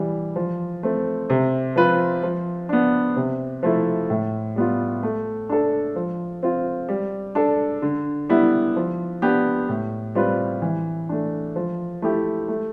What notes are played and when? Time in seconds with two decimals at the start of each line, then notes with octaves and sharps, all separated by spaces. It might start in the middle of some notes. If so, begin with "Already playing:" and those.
Already playing: E3 G3
0.36 F3
0.83 A3 C4
1.30 C3
1.76 F3 C4 F4 B4
2.23 F3
2.69 B3 D4
3.16 C3
3.63 F3 A3 E4
4.10 A2
4.56 G3 B3 F4
5.03 A3
5.49 D4 A4
5.96 F3
6.43 C4 F4
6.89 G3
7.35 D4 A4
7.82 D3
8.29 G3 B3 E4
8.76 F3
9.22 B3 D4 G4 B4
9.69 A2
10.15 G3 C4 F4 B4
10.62 E3
11.09 A3 D4
11.56 F3
12.02 A3 E4 G4
12.49 A3